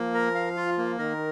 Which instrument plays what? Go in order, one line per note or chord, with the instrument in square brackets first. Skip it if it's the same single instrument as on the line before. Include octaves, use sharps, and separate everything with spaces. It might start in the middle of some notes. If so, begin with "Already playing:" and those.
Already playing: [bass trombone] F3 [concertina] A#3
[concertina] A#4
F5
F4
A#3
[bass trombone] D#3 [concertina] A#4